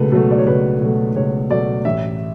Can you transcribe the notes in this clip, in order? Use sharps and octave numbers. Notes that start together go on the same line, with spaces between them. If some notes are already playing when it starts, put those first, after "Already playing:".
Already playing: C#2 B2 F#3 A3 A4 B4
B2 F#3 A3 A4
D5
C#5
C#2 B4
B2 F#3 A3
C#2 C#5
B2 F#3 A3 D5
A1 E5